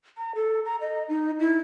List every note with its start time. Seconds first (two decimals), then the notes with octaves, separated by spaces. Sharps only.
0.17 A#5
0.35 A4
0.65 A#5
0.81 D#5
1.09 D#4
1.39 E4